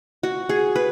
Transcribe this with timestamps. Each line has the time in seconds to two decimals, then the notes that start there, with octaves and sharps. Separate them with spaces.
0.23 F#4
0.49 G#4
0.76 B4